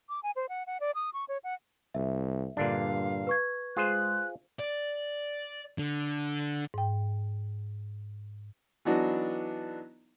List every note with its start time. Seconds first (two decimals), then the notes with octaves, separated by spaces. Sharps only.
0.09 D6
0.23 G#5
0.36 C5
0.49 F#5
0.67 F#5
0.80 D5
0.95 D#6
1.13 C#6
1.28 C#5
1.44 F#5
1.94 C2 E5
2.57 G2 A#2 D3 D4 F5
3.27 B4 C#6 G#6
3.77 G#3 F4 G#4 C5 F#6
4.60 D5
5.78 D3
6.74 G#2 G5
8.85 E3 F#3 B3 D4 D#4 F#4